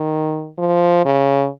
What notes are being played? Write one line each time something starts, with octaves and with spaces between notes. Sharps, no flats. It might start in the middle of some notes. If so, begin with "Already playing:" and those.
Already playing: D#3
F3
C#3